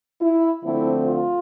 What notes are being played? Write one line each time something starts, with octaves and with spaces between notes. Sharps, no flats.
E4
D3 F3 A3 C4 E4
F4